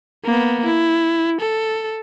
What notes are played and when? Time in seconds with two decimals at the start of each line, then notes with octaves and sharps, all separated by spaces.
0.25 A#3 B3
0.65 E4
1.40 A4